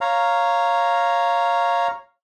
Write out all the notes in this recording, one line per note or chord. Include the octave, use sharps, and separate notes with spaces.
C#5 F5 A#5